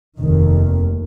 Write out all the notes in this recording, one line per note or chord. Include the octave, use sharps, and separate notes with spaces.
F1 D#2 D#3